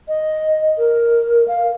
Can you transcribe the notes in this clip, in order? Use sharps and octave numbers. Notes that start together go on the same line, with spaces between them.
D#5
A#4
F5